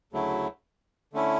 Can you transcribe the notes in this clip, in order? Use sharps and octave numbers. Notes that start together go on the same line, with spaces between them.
D2 C#3 F#3 A3 E4
D3 A3 C#4 E4